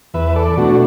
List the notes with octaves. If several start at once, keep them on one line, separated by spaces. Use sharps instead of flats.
E2 B4 E5
A4 D5
B2 A3 D4 F#4